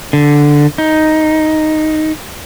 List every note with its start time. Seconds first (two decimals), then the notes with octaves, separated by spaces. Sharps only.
0.13 D3
0.78 D#4